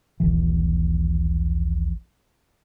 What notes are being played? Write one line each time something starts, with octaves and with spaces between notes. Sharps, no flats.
D#1 A#1 E3